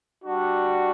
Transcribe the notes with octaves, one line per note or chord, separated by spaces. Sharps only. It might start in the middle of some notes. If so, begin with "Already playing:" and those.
G3 D4 F#4